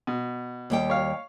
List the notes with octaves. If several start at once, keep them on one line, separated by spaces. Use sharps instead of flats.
B2
D#2 G3 G5
C#5 F5